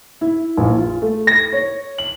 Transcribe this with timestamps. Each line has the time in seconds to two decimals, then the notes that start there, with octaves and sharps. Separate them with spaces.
0.21 E4
0.58 A#1
0.78 F4
1.02 A3
1.27 A#6
1.53 C#5
1.98 F#7